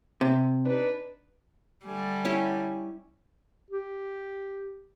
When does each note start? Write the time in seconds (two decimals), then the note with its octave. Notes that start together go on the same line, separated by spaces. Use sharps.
0.21 C3
0.65 D4 D#4 B4
1.86 D3 G3 A3 G#5
2.25 C#4 E4 G4
3.70 G4